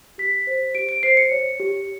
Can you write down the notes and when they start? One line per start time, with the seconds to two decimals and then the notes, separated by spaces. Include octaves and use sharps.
0.18 G4 B6
0.47 C5
0.75 G4 D7
0.89 D7
1.03 C5 C7
1.17 C#7
1.32 C#5
1.60 G4